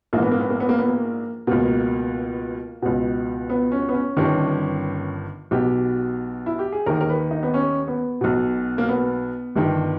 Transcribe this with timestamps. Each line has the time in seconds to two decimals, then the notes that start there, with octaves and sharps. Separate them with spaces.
0.13 A#1 G#2 E3 A#3
0.22 B3
0.31 A#3
0.41 B3
0.50 A#3
0.60 B3
0.69 A#3
0.78 B3
0.88 A#3
1.47 C#2 B2 A#3
2.82 C#2 B2
3.49 B3
3.72 C#4
3.89 B3
3.94 C#4
4.17 G1 G2 D#3 C#4
5.51 B1 B2 G4
6.46 E4
6.59 G4
6.72 G#4
6.86 D#2 D#3 A#4
7.01 A#4
7.09 B4
7.31 D#4
7.43 B3
7.54 C#4
7.88 B3
8.21 B1 B2
8.78 A#3
8.89 B3
9.56 G1 G2 D#3